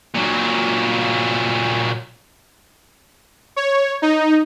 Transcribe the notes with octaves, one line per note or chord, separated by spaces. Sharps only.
A#2 F#3
C#5
D#4